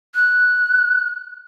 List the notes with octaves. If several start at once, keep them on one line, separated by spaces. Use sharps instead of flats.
F#6